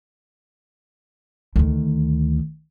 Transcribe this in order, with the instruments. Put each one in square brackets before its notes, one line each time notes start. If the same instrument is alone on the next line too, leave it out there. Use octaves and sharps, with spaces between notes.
[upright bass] D2 D#3